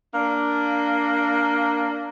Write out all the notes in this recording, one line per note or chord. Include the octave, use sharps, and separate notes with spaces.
A#3 D4